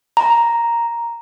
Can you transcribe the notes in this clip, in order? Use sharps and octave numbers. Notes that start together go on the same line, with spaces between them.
A#5